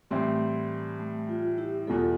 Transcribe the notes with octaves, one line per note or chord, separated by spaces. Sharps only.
A2 E3 G3 A3 C4
A3
F4
E4 G4
E2 B2 G3 F4 A4